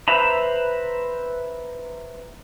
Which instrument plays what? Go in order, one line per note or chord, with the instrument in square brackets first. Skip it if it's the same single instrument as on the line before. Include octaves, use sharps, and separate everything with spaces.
[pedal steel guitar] B4 C5 E5 A#5 B5